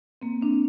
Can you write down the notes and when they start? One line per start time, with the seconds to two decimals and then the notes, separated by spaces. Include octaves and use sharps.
0.22 A#3 C4
0.42 C4 D4